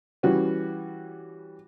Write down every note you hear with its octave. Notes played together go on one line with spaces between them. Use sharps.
E3 G3 C#4 F#4